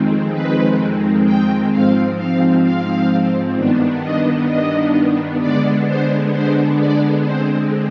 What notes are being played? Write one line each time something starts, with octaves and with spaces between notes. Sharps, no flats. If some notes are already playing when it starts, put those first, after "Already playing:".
Already playing: F2 D#3 G#3 C4
B4
G5
G#2 F3 C4 F5
F5
F5
G2 D#3 B3 D4
D#5
D#5
D3 G#3 B3 D4 D5
C5
C5
D5
D3 G#3 C4 C5